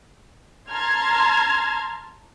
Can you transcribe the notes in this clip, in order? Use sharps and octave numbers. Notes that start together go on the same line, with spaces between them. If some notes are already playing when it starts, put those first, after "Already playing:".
A5 A#5 C6 F6 G#6